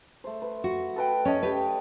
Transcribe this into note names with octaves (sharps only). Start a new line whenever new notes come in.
A3 C5
B4
F#4
A4 B4 G5
C#4 C#5 D#5 A5
G4 B4